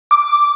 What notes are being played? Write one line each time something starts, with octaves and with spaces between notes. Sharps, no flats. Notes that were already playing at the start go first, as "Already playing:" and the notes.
D6